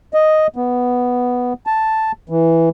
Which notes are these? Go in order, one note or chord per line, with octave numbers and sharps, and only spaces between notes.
D#5
B3
A5
E3